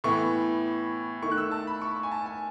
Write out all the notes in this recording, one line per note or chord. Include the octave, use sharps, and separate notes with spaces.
A2 E3 B3 C#6
D#3 A3 C#6
F#6
E6
A5
B5
C#6
C#6
G#5
A5
G#5